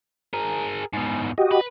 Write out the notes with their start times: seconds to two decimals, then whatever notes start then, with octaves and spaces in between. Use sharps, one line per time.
0.34 G#4 A#4
0.93 G#2 B2
1.38 F#4 G4 D#5
1.51 B4